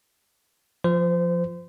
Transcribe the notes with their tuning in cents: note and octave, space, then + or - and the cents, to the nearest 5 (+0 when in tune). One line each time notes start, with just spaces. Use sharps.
F3 +5 C5 -30